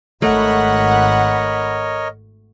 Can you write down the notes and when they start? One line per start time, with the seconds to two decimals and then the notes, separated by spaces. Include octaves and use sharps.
0.22 G#1 A3 A#4 C#5 D#5 F#5 B5